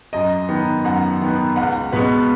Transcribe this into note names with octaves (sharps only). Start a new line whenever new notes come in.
F#2 D#5
D#3 B3
F#2 F#5
D#3 B3
C#2 F#5
B2 G#3 B3 B4